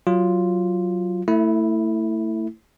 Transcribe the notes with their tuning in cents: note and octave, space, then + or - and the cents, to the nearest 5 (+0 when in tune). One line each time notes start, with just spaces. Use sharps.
F#3 +5 F4 +0
A3 +25 E4 -5